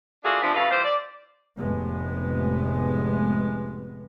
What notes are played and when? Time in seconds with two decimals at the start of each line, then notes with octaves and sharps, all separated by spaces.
0.24 A3 A#3 D4 F4 F#4 G#4
0.42 C3 F3 B3 D4
0.54 A2 C#3 F#3 A4 B4 F5
0.70 E3 G3 F4 C5
0.84 D5
1.57 F1 A2 G#3 B3